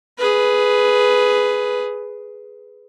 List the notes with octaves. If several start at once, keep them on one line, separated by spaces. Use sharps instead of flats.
G#4 B4